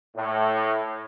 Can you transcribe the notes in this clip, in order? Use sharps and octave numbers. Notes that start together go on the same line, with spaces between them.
A2